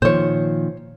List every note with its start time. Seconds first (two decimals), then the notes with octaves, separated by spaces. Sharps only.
0.02 A#2 D#3 F3 C5 C#5